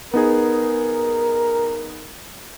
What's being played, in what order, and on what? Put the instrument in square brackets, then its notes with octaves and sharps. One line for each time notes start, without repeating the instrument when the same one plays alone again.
[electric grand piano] B3 D#4 G#4 [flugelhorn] A#4